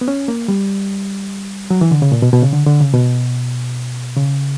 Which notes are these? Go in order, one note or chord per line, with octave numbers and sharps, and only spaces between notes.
B3
C#4
A#3
G3
F#3
E3
D3
C#3
A#2
B2
B2
C#3
D3
D3
C#3
B2
C#3